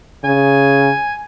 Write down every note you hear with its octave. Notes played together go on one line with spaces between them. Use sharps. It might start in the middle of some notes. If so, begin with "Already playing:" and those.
C#3 G#5